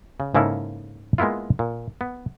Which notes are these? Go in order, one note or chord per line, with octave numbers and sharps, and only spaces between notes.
C#3
G#2 C#3 A#3 E4 A4
G#3 A#3 B3 E4 F4
A#2
B3